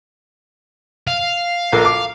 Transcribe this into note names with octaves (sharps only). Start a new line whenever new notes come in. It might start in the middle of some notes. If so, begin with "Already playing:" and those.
F5
A#1 A4 A#4
D6